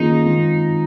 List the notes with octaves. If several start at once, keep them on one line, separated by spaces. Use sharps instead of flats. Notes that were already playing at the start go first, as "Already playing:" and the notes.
Already playing: D#3 A#3 C#4 D#4 F4 G#4
D#3 G#3 C4 F4